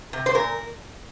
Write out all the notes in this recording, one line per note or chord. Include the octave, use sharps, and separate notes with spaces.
C3
C5
A#2 A#4